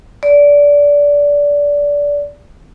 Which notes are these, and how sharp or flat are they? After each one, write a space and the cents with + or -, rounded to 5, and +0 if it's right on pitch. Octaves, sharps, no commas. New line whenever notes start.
D5 -20